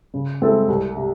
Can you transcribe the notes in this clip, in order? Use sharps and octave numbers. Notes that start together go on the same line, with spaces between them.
C#3
G#3 C4 E4 A4
C2
C3